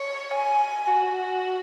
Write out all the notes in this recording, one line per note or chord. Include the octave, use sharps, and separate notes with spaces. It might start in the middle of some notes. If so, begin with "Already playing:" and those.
Already playing: C#5
G#5
F#4